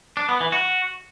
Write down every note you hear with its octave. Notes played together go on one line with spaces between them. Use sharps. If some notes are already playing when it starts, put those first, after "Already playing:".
D4
B3
E3
F#4